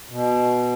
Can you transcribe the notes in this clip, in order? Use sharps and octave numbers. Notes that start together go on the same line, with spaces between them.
B2